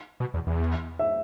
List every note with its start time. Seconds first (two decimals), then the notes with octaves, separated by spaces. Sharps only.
0.20 B2
0.34 E2
0.47 E2
0.99 E5